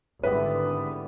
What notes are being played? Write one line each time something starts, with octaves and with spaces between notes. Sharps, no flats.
G#1 G#2 D3 E3 G3 B3 B4